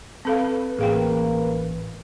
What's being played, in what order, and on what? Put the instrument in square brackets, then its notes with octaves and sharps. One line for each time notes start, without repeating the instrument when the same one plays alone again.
[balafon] C4 A4 F5 [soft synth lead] B4
[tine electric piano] A1 [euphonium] A#3 [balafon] G#4 F5 G5